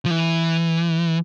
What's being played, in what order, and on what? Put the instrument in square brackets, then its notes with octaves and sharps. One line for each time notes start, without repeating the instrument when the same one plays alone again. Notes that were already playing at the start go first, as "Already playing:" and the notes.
[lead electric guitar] F3
E3